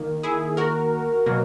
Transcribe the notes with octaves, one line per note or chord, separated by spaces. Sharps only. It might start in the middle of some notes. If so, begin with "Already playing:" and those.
Already playing: D#3 A#3
E4 G#4
F#4 A#4
B2 F#3 A#3